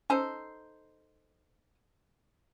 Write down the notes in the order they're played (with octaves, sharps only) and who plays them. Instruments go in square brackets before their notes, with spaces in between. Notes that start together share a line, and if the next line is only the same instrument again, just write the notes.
[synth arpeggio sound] C#4 [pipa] D#4 A4 C5